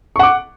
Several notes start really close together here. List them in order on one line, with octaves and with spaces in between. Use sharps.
C#6 F#5 D6